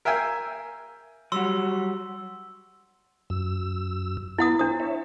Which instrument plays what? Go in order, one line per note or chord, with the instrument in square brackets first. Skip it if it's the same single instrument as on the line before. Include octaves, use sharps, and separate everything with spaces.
[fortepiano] A#4 E5 F5 G5 G#5 E6
[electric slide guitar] F#3 G3 F#4 [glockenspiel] C6 E6
[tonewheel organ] F#2 E6
[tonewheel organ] B3 [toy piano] E4 F#5 D#6
[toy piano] D4 D#6 [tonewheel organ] C5
[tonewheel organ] C#5 E5